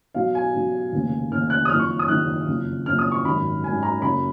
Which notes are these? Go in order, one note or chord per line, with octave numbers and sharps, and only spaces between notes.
B1 B2 F5
G#5
B1 B2
F1 D#2 C#3
F1 D#2 C#3 F6
F#6
D#6
F#1 F2 D#3 F6
C#6
D#6
F#1 F2 D#3 F#6
F#1 F2 C#3
F#1 F2 C#3 F6
D#6
C#6
G#1 F#2 D#3 B5
G#1 F#2 D#3 G#5
A#5
F#1 F#2 C#3 B5